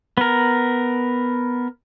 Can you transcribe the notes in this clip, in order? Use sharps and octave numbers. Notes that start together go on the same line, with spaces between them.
B3 A#4